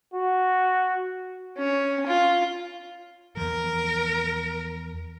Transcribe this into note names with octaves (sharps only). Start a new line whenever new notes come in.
F#4
C#4
F4
E2 F3 A#4